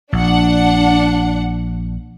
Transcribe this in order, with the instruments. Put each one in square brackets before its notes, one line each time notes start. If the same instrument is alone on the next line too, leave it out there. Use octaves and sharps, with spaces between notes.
[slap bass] A#1 [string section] D4 F#5